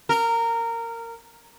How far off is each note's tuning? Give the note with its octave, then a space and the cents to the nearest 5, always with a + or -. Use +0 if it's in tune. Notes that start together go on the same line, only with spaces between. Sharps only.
A#4 -15